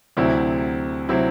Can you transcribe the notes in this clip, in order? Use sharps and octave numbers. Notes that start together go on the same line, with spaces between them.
D2 C3 F#3 C4 E4
C3 F#3 C4 E4